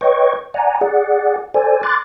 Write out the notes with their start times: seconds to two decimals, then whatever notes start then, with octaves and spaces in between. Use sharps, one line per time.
0.01 B4 C#5 D#5 G5 C#6
0.54 D5 F#5 G#5 A#5
0.81 G#4 D5 F#5
1.54 A4 C5 D5 G#5
1.83 C6 D6 F#6 A6